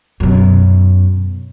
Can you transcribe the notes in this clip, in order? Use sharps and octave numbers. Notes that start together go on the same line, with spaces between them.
F#2 B2